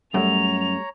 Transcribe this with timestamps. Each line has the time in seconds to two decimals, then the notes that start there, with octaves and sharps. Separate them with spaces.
0.14 F#2 G3 A3 C#5 A#5 F7